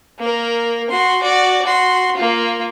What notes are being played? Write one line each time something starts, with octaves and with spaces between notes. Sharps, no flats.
A#3 A#4
F#4 C6
F#4 D5
F#4 C6
A#3 F4